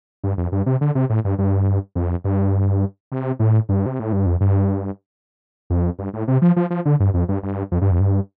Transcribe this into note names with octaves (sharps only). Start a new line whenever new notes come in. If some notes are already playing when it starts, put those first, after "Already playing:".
G2
F2
G2
C3
D3
C3
A2
G2
G2
F2
G2
C3
A2
G2
C3
A2
G2
F2
G2
F2
G2
A2
C3
F3
F3
F3
D3
G2
F2
G2
G2
F2
G2
F2
G2